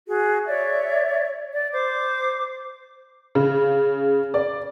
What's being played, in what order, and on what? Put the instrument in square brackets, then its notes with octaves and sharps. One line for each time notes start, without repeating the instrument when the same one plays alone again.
[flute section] F#4 G#4
C#5 D5 E5
D5
C5 D6
[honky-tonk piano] C#3
D5